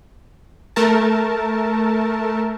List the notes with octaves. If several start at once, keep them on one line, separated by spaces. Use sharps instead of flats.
A3 A#4 A5